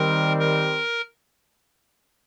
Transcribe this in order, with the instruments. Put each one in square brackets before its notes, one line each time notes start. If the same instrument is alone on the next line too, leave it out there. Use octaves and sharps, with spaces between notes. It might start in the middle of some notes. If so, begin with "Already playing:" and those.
Already playing: [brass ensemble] D#3 G3 C4 [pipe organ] A#4
[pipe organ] A#4